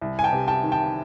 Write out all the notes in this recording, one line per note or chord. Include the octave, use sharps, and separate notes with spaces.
C2
G#5
G5 A5
C3
G5 A5
D#3
G5 A5